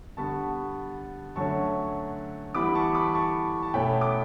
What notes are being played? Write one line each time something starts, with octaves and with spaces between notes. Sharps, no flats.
D3 G3 B3 A5 C#6
D3 F#3 A3 C#4 A5 C#6
E3 G3 B3 B5 D6
B5
A5 C#6
B5 D6
A5 C#6
A5
B2 A3 C#4 G5 B5
D6